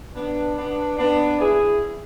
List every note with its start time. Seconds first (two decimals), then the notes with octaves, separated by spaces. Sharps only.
0.14 B3 D4
0.56 B3 D4
0.97 B3 D4
1.39 E4 G#4